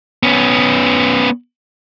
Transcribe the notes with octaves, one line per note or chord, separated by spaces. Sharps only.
B3 C#4